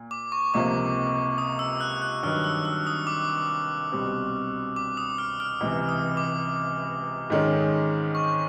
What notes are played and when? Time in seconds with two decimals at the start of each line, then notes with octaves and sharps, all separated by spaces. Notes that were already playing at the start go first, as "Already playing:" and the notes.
Already playing: A#2
0.11 D6
0.32 C#6
0.54 C#2 C3 F3 A#3 D6
1.38 D#6
1.59 E6
1.81 F#6
2.02 F#6
2.23 G2 D#3 F#3 F6
2.44 E6
2.65 E6
2.87 D#6
3.07 D6
3.92 C2 B2 G3 C4
4.76 D6
4.97 D#6
5.18 F6
5.40 F6
5.60 C#2 C3 E3
5.89 D#6
6.17 D6
7.30 G#2 D#3 G#3 C#4
8.15 C#6